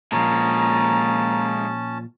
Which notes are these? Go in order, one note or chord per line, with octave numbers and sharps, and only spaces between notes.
A#2 D#3 F3 G#3 A#3 C#4 A5 A#5